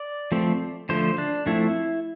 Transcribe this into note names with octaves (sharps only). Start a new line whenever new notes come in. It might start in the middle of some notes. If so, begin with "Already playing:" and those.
Already playing: D5
F3 A3 C4
D3 F3 A3 C5
D4
F3 A3 C4 E4